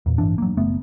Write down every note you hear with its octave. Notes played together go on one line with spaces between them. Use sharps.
E2 A#2
A1 G2 E3 D4
F#3 A#3
F#1 A3 B3